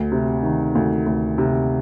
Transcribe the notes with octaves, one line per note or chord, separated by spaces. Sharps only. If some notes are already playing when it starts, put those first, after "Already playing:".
Already playing: D2
C3
D#3
D2
D2
C3